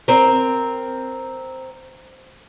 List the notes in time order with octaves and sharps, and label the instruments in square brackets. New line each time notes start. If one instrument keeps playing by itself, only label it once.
[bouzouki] C4 A#4